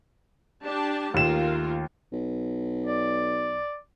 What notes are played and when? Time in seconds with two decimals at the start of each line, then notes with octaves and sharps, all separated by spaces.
0.64 D4 G4 A5
1.14 D#2 A3 F4 A#4 E7
2.12 B1
2.87 D5